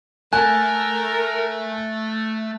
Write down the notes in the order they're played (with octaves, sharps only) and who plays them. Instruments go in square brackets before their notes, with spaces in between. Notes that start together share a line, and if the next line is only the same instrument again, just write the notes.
[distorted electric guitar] A3 [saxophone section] A#4 [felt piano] G#5 [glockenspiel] F#6